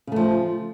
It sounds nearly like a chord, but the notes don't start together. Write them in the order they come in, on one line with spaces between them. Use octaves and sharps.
C#3 A3 F3